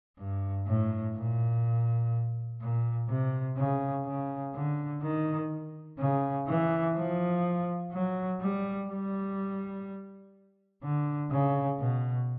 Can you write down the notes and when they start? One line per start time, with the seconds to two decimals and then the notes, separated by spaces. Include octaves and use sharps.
0.18 G2
0.67 A2
1.15 A#2
2.61 A#2
3.09 C3
3.57 C#3
4.06 C#3
4.55 D3
5.02 D#3
5.99 C#3
6.47 E3
6.95 F3
7.92 F#3
8.41 G3
8.89 G3
10.83 D3
11.31 C#3
11.80 B2